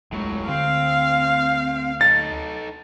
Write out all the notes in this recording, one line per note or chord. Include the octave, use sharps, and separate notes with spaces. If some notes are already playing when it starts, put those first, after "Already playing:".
D#1 A2 F#3 G#3 A3
D2 D3 C4 F5
D#4 A4 A6